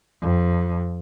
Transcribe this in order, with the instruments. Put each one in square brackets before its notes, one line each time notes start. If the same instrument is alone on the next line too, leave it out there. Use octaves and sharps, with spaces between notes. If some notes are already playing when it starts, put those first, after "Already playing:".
[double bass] F2